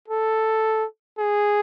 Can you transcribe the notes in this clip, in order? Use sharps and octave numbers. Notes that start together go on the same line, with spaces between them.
A4
G#4